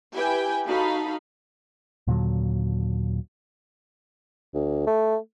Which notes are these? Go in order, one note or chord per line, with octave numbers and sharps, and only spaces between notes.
E4 G4 B4 G5 G#5
D#4 F#4 A4 F5 B5
D#2 A#2 D3 F#3
D2
A3